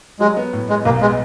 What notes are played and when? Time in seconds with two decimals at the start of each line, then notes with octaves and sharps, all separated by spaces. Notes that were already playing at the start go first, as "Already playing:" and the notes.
0.20 F#3 G#3
0.37 B3
0.53 A2
0.69 G#3 B3
0.85 B1 A#3
1.01 G#3 B3